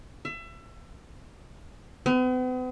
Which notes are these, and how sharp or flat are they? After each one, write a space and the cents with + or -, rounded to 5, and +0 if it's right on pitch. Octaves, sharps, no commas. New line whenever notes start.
E5 +30
B3 +45